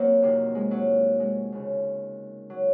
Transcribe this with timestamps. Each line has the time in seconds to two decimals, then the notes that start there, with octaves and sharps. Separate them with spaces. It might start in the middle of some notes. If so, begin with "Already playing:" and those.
Already playing: F#2 F#3 A#3 C4
0.22 F2 C3 D#3
0.55 G#3
0.71 F#3
1.20 G#3
1.52 D#2 C#3
2.50 F#3